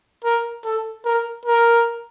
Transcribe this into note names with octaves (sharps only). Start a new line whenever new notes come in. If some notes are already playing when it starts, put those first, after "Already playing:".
A#4
A4
A#4
A#4